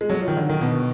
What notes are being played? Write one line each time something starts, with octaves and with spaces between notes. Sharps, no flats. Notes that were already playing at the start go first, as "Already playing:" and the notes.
G#3
F#3
F3
D#3
D3
D#3
B2